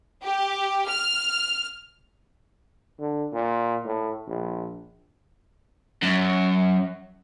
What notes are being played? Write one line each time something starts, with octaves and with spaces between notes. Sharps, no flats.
G4
F6
D3
A#2
A2
A#1
F#2